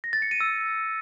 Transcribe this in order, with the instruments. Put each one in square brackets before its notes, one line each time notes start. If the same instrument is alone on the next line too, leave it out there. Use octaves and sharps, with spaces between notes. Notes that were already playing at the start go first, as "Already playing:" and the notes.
[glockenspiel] A#6
A6
C#7
D#7
E6